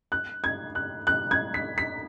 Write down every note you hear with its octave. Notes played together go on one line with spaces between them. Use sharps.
F#6
G#6
F#6
F#6
G#6
B6
B6